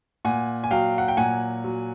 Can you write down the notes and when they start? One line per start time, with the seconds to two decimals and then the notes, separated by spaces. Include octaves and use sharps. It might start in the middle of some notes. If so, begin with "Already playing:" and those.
0.25 A#2 F#5 G#5
0.64 G#5
0.71 F#3 F5 G5
0.98 F#5
1.08 G5
1.17 A#2 F#5 G#5
1.64 F#3